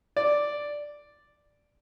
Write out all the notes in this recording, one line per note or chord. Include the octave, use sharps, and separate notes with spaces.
D5